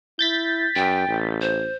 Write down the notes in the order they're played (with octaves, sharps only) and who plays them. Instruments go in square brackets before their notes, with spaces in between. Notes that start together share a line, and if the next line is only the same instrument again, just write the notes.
[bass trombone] E4 [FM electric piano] G6 A6 B6
[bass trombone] F#2 [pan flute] G5
[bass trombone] A1
[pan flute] C5